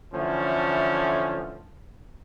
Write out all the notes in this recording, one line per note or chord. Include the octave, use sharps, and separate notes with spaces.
D3 E3 F3 A3 C#4